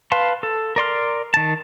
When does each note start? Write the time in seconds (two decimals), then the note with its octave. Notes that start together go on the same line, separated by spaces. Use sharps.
0.12 B4 F5 A5 C6
0.43 A4
0.76 A#4 D5 C6 F6
1.34 D#3 A5